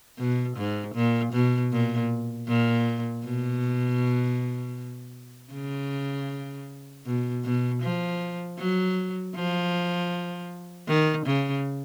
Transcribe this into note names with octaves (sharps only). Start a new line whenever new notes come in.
B2
G#2
A#2
B2
A#2
A#2
B2
C#3
B2
B2
F3
F#3
F3
D#3
C#3